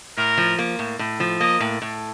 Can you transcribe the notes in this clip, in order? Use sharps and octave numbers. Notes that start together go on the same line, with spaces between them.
A2 A#4
F3
A#3
A2
A2
F3
A#3 D#5
A2
A2